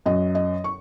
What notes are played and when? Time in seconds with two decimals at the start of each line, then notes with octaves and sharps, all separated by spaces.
0.06 F#2 F#3 D#5
0.35 D#5
0.64 C#6